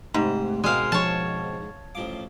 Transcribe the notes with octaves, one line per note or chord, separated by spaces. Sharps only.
G#2 C3 A3
B2 G#3 C4 A#4 F5
F3 C#5 A5
A1 F3 F5 D6